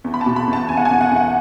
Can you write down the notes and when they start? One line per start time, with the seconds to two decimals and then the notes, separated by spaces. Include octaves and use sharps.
0.04 E2
0.14 B5
0.21 A5
0.26 B2
0.36 B5
0.48 E2
0.53 A5
0.68 E2 G#5
0.77 F#5
0.85 G#5
0.91 E2
1.01 F#5
1.11 E2 F#5